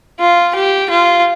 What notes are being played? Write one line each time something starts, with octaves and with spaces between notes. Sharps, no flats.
F4
G4
F4